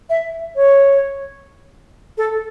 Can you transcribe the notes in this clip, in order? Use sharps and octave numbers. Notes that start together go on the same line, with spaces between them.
E5
C#5
A4